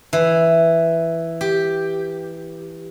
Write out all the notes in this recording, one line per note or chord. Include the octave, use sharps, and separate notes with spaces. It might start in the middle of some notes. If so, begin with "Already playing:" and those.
E3
G4